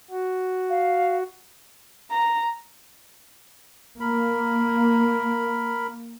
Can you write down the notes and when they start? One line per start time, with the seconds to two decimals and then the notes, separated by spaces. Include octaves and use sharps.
0.10 F#4
0.70 F5
2.12 A#5
4.00 A#3 A#4 B5